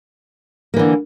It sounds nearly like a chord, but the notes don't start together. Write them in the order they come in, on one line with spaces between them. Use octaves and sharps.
A#3 E3 D3